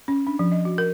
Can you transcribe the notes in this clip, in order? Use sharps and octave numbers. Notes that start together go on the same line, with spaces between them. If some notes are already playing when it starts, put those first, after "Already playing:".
C#4
D4
F3
D#5
F#4
A#4